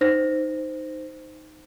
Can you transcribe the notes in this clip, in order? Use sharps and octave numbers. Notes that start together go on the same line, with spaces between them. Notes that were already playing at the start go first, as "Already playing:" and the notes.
D#4 C5 A#6